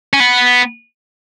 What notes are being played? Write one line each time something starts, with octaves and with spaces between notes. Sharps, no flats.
C#4
B3